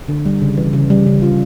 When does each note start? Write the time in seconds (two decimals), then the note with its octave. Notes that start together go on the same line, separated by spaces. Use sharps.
0.09 D3
0.25 G3
0.42 C#3
0.57 E3
0.73 C#3
0.90 G3
1.06 C#3
1.22 F4